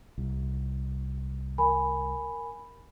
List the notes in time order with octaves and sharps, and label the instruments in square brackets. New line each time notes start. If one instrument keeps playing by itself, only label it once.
[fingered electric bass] C2
[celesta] A#4 G#5 B5